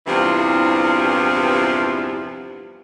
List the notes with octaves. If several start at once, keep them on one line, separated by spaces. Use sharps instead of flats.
E2 G2 C3 E3 F3